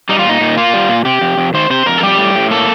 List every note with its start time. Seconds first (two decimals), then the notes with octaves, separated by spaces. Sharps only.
0.09 G3 D#4
0.19 F4
0.24 A#2 D#4
0.41 A#2
0.57 A#3 F4
0.73 G3
0.89 A#2
1.05 C3 G4
1.21 F2
1.38 F2
1.54 D#3 C5
1.70 C3 C5
1.86 F2 A#4
1.98 A4
2.03 G3 G4
2.18 A2
2.35 A2
2.51 A#3 A4